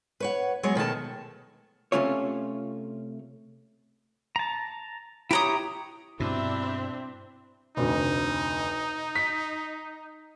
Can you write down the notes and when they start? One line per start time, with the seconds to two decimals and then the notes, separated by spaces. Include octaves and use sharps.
0.20 B4 C#5 F#5
0.63 F#3 G#3 B3 C#5
0.75 B2 D#3 A3 A5
1.92 C3 A3 C#4 F4 C#5
4.36 A5 A#5
5.31 E4 G4 C#5 G5 A#5 D#6
6.20 G2 B2 C4 D4 E4 E5
7.77 F1 D2 D#4
9.15 B6